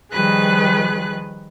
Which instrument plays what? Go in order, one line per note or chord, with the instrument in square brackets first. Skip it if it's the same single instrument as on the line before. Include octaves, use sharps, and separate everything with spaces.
[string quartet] D#3 F3 G3 G#4 B4 F#6